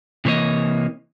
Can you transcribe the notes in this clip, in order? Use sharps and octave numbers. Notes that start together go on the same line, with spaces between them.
C3 E3 A#3 C#5 D#5